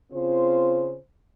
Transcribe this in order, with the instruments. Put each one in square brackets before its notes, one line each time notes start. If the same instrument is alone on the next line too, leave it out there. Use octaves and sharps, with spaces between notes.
[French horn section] C#3 C4 F4 C5